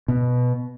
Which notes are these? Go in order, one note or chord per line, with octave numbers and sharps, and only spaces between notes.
B2